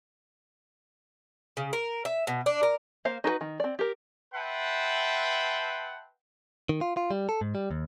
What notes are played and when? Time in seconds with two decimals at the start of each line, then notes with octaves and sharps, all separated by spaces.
1.57 C#3
1.73 A#4
2.05 E5
2.27 B2
2.46 D4
2.63 A#4
3.05 A#3 C5 F5
3.24 D#4 F#4 A4 B4
3.41 D#3
3.60 C4 D5
3.79 G4 A#4
4.34 B4 E5 F#5 G5 A5 C6
6.69 D#3
6.81 F4
6.97 F4
7.11 G3
7.29 A4
7.41 G#2
7.55 G3
7.71 D#2